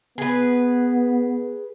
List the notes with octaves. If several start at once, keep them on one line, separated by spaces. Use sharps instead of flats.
B3 G#4 B4